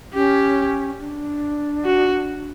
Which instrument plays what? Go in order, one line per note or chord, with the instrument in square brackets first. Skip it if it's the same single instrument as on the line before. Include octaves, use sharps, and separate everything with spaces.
[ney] C#4 [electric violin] G4
[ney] D4
[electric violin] F#4